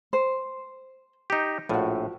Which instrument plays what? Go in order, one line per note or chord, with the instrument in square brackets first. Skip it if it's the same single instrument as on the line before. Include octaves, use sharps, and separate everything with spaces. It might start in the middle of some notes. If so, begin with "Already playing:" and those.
[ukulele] C5
[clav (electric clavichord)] D#4 G4
[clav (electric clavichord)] A#1 A2 [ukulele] F4 F#4